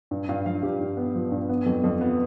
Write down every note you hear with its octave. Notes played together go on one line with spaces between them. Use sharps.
G2
G2 F5
F3 F5
G2 G4
G2
B3
F3
G2
B3
F2
F2
B3